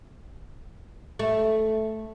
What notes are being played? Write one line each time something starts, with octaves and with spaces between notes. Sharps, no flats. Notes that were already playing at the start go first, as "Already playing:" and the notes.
A3